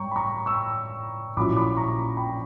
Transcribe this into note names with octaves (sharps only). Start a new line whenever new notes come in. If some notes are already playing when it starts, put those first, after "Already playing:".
Already playing: G2 C#5 G5 A#5 C#6
B5
A#5 C#6
C#6 E6
A#1 A#2 F#3 C#4 E4 B5 D6
B5 D6
A#5 C#6
G5 B5